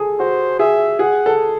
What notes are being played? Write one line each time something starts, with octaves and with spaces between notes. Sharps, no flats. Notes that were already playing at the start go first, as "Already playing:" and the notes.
Already playing: G#4 A4
F#4 C5
G#4 E5
G#4 F#5
A4